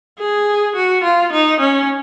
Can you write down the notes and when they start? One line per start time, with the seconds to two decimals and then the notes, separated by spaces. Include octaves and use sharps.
0.19 G#4
0.76 F#4
1.04 F4
1.33 D#4
1.60 C#4